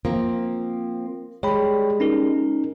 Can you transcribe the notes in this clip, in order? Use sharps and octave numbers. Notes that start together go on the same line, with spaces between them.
F3 A#3 C4
G3 G#3 C#5 G5 B5
C#4 D#4 A#4